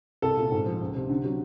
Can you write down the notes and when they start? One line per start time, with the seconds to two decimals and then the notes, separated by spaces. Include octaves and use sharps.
0.22 C2 A4
0.37 A#2
0.52 G#2
0.66 F3
0.81 C#2
0.95 C3
1.09 D3
1.24 F#3